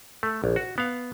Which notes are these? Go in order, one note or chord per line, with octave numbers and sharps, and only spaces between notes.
A3
A#1
F#4
B3 F5